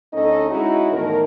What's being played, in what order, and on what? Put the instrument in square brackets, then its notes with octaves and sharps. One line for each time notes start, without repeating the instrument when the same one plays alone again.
[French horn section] D2 C#4 D#4 A4 D#5
G#3 C#4 D#4 E4 F#4 G#4
E2 A2 D#3 D#4 A#4